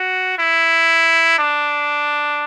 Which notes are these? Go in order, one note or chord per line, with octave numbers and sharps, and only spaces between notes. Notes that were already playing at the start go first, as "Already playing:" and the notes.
Already playing: F#4
E4
D4